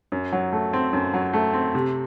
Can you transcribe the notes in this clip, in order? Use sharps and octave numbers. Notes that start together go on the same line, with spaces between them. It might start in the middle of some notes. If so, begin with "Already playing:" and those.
F#2
F#3
A3
C4
F#2
F#3
A3
C4
C3